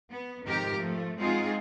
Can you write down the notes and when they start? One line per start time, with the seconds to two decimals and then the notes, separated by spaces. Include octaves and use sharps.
0.11 B3
0.45 F2 G#2 C3 D#3 G4 A#4
0.75 F3 A3
1.17 G#3 C4 D#4 F4 F#4 G#4